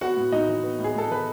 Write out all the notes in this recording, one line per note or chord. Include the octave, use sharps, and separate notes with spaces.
B3 F#4 F#5
A2
A2 D#4 D#5
E3
B3
A2
G#4
A2 A4
E3 B4